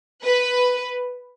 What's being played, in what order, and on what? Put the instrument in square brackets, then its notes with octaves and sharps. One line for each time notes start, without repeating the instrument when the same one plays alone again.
[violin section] B4